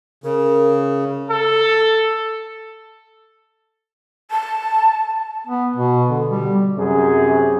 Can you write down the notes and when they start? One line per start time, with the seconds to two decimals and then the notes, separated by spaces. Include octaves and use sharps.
0.24 C#3 A#4
1.31 A4
4.31 A5
5.47 B3
5.76 B2
6.10 D3
6.30 G3
6.77 F#2 C3 G#4